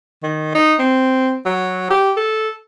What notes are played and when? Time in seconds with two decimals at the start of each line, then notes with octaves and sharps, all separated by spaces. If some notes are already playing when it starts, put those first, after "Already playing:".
0.23 D#3
0.55 D#4
0.79 C4
1.46 F#3
1.90 G4
2.17 A4